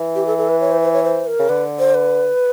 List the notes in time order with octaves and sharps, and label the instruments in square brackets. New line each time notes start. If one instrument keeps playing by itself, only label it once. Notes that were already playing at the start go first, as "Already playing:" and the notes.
Already playing: [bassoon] E3
[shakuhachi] G4
A4
A4
B4
C#5
C5
C5
C#5
C5
A#4
[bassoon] C#3
[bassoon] D3 [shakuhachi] B4
[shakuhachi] C5
B4